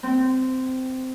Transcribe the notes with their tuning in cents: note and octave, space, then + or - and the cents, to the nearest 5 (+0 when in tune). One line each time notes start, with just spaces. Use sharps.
C4 -15